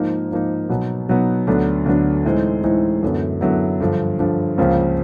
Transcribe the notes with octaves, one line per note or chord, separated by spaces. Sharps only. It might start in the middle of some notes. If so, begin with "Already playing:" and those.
Already playing: G#2 F3 A#3 D#4
G#2 F3 A#3 D#4
B2 F#3 B3 D#4
B2 F#3 B3 D#4
D2 D3 F#3 B3 D4
D2 D3 F#3 B3 D4
A2 E3 G#3 C4 D#4
A2 E3 G#3 C4 D#4
F#2 D3 F#3 B3 E4
F#2 D3 F#3 B3 E4
G2 D3 F3
G2 D3 F3
C#2 C#3 F3 A#3